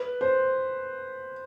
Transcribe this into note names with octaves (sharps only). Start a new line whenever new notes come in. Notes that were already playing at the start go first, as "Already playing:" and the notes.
Already playing: B4
C5